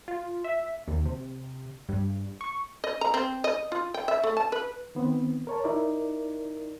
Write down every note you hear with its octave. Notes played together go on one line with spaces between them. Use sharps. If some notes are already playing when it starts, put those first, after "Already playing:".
F4
E5
D#2
C3
G2
C#6
D#5
A#5
C4
D#5
F4
G5
E5
A3
A5
B4
D#3 B3 C4
A#4 C#5 A5
D#4 E4 A#4 D5